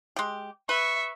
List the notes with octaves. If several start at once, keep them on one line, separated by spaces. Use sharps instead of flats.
G#3 G4
B4 E5 C#6